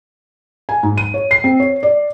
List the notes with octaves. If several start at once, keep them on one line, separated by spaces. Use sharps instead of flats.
G#5
G#2
D#7
C#5
C7
C4
C#5
D5